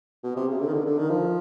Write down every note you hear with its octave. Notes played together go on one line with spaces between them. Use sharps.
B2
C3
C#3
D3
D#3
D3
D3
D#3
F3